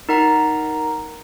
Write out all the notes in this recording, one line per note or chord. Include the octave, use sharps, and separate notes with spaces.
D#4 A#4 F#5 A#5 C7